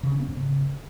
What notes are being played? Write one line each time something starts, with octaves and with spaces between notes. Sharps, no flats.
C#3
C#4
B3
G#2
C#3